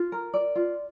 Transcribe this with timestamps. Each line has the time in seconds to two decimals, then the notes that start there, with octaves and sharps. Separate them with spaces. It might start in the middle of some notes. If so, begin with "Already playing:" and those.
Already playing: F4
0.12 A#4
0.34 D5
0.55 F4